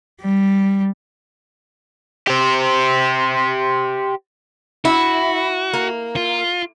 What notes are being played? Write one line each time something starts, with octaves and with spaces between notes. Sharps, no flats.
G3
G4 C5
E4 F#4
A#3
F4